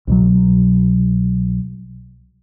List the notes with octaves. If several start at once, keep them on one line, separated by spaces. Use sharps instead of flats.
C2 B2 F#3